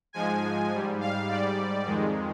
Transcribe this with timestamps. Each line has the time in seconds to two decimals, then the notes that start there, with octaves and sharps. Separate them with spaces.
0.13 G#2 F3 G#3 G#5
0.72 G#2 G3
1.00 F5
1.28 G#2 G3 D5
1.86 F2 D#3 G#3